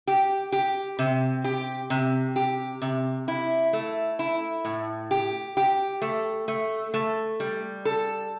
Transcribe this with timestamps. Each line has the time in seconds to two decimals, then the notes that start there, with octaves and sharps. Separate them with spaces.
0.07 G4
0.52 G4
0.99 C3
1.44 G4
1.90 C3
2.36 G4
2.82 C3
3.28 E4
3.73 A3
4.19 E4
4.65 A2
5.11 G4
5.57 G4
6.02 A3
6.48 A3
6.94 A3
7.40 G3
7.85 A4